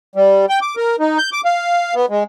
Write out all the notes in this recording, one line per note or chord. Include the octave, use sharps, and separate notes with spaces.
G3
G5
D6
A#4
D#4
G6
D6
F5
B3
G#3